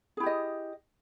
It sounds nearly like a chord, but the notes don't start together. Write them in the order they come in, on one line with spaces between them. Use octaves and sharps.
G#4 E4 G4 D#5